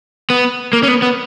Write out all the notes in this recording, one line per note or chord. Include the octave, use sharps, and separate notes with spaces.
B3
A#3
C#4
B3
B3